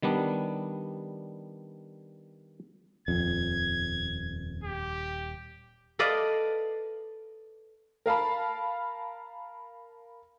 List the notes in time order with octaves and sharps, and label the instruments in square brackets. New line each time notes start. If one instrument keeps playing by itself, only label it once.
[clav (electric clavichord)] D#3 G3 B3 D4
[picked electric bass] D#1 [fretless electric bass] F2 [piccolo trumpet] G#6
[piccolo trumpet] G4
[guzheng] A4 B4 D5 D#5 F5
[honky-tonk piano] A#4 F5 A5 B5